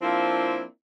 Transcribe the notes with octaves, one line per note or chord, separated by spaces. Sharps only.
F3 A#3 C4 D4 E4 F4